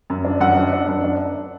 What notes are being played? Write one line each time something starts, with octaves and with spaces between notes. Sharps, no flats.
F#2
D4
F#2 F#5
D4
D4
F#2
D4